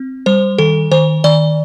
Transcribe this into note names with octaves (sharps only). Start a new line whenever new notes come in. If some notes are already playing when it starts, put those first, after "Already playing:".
Already playing: C4
G3 C5
D#3 A4
D#3 C5
D#3 D5